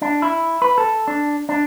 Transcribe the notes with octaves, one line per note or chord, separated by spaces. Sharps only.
D4
E4
B4
A4
D4
D4